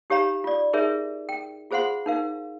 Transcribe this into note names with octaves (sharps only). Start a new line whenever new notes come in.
D#4 G4 C#5 F5 A#5 B5
F4 D5
D#4 G#4 A#4 C#5 E5
G5
F4 G#4 C5 F5 F#5 C6
D#4 A#4 F5